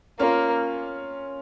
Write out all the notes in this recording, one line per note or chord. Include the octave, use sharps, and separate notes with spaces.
A#3 C#4 F4